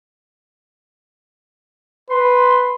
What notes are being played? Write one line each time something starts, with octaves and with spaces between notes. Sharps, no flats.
B4 C6